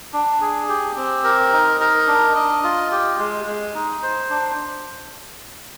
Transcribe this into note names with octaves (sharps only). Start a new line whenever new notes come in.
D4
G#4
G4
C4
A#4
D#4
A#4
D4
D#5
F4
G4
G#3
G#3
D#4
C5
D4